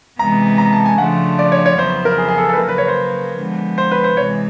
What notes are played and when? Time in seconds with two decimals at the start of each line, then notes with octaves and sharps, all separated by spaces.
0.19 C3 E3 G#3 B3 A#5
0.58 A#5
0.73 A5
0.85 G#5
0.98 C#3 F3 A3 D4 F4 F#5
1.39 D5
1.52 C#5
1.66 C#5
1.79 F2 C#3 F#3 B3 E4 C5
2.05 A#4
2.18 G#4
2.28 G#4
2.38 A4
2.48 A4
2.53 B4
2.58 C#3 F#3 A#3 A#4
2.69 B4
2.78 C#5
2.88 C5
3.38 D3 F3 G#3 B3
3.78 C5
3.91 B4
4.04 C5
4.17 C3 E3 G#3 C#5